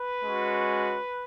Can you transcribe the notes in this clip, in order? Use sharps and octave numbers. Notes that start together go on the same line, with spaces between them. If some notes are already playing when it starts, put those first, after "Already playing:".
Already playing: B4
G#3 C#4 F#4